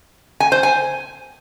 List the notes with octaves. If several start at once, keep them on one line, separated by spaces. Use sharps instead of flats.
G#5
C5
G#5